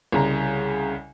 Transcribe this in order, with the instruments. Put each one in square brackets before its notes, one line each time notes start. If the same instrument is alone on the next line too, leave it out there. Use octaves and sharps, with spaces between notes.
[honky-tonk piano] C2 C#3 A#5